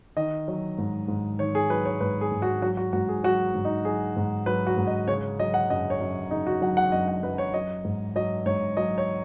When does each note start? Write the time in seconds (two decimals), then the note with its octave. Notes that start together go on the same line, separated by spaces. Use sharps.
0.17 D#3 D#5
0.48 F#3
0.78 G#2
1.08 G#2
1.39 D#3 C#5
1.55 G#4
1.70 F#3 B4
1.85 C#5
2.01 G#2 B4
2.21 G#4
2.32 G#2
2.42 F#4
2.62 F#3 F#4
2.77 F#4
2.93 G#2 F#4
3.09 G#4
3.24 F#3 F#4
3.54 G#2
3.65 D#4
3.85 F#3 G#4
4.16 G#2
4.46 F#3 B4
4.67 F#4
4.77 G#2
4.87 D#5
5.08 C#3 C#5
5.39 F#3 D#5
5.54 F#5
5.70 F#2 D#5
5.90 C#5
6.01 F#2
6.31 C#3 D#4
6.47 F#4
6.61 F#3 F#5
6.77 F#5
6.92 F#2 D#5
7.08 F#5
7.23 F#2 B4
7.38 C#5
7.54 F#3 D#5
7.85 G#2
8.16 F#3 D#5
8.46 G#2 C#5
8.77 F#3 D#5
8.98 C#5